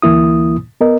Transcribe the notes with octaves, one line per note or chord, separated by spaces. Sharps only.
D2 E3 A#3 E4 D#6
B3 A#4 D#5